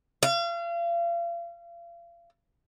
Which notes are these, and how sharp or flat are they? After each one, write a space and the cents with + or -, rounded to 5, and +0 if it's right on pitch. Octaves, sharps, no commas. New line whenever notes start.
F5 -35